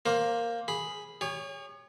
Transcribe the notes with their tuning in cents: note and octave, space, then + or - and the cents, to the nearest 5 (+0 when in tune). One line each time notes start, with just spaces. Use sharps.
A#3 +0 C5 +20
G#4 +0 B5 +0
G#4 -45 C#5 +10